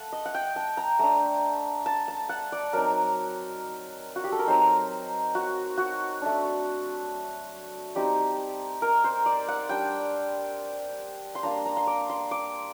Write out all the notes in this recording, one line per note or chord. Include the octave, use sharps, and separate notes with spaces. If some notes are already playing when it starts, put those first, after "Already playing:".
Already playing: A3 F#5 A5
D#5
F#5
G5
A5
A#5
A3 D4 A#5
A5
A5
F#5
D5
F#3 C4 D#4 A#4
F#4
G4
A4
A#4
F#3 C4 D#4 C5
F#4
F#4
A3 D4
G3 C4 D#4 G4
A#4
C5
D5
F#5
G3 D4 G5
C6
G3 A#3 D4 A#5
A#5
C6
D6
C6
D6